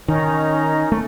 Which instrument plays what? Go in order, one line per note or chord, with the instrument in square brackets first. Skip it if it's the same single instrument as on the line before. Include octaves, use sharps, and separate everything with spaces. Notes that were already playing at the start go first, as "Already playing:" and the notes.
[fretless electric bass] D#3 [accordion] C#4 D#4 A#5
[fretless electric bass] A3